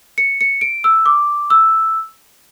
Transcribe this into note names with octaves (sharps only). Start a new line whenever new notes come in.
C#7
C#7
D7
E6
D6
E6